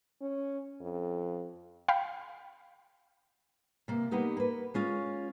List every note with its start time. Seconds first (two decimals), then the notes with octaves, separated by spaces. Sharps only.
0.21 C#4
0.80 F2
1.88 F5 G5 B5
3.88 C3 A#3
4.11 G3 A#3 B3 D#4 G4
4.37 A#3 B4
4.74 G#3 C#4 F4